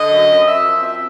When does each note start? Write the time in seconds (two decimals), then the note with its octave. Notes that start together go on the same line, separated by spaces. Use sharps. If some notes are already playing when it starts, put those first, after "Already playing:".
Already playing: D3 D#5
0.11 F#2
0.29 F#2
0.47 F#2 E5
0.64 F3
0.82 C4 E5